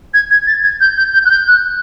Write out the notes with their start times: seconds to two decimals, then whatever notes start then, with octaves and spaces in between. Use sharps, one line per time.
0.14 G#6
0.30 G#6
0.47 A6
0.63 G#6
0.81 G6
0.97 G6
1.14 G6
1.25 F#6
1.31 G6
1.47 F#6